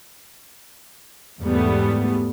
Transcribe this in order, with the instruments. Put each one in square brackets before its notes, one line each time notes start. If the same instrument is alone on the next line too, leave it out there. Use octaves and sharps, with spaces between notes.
[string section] E2 G#2 G3 A3 B3